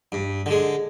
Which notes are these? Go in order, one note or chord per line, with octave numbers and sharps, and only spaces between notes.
G2
D3 G#3